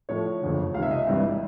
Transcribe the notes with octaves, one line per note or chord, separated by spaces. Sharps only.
A2 F3 A3 C#5
F#1 F2 D3
C#2 C3 D#3 F5
E5
D#5
E5
G#1 G2 E3 G3 C4